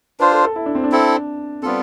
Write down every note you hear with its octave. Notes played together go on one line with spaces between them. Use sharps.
D4 F4 B4 C5
A4
A4
E4
D4
C4
D4
C4 E4 A4
G3 B3 C4 F4 A4